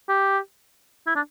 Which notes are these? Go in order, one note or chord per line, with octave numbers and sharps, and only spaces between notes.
G4
E4
D4